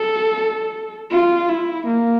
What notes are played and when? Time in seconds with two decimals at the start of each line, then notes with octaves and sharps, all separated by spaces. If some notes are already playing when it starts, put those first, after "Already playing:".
Already playing: A4
1.11 F4
1.49 E4
1.87 A#3